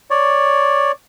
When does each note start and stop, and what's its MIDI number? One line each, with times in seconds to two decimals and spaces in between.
0.10 0.92 73
0.10 0.92 74